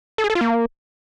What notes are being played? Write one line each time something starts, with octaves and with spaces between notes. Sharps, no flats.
A4
G#4
A4
F4
A#3